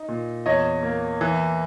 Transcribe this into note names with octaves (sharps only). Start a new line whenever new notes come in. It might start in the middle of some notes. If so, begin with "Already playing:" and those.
Already playing: D#4
A#2
E2 C#5 D#5
A#3
E3